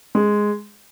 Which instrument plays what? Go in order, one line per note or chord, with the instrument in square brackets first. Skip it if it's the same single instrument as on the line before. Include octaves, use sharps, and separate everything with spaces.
[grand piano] G#3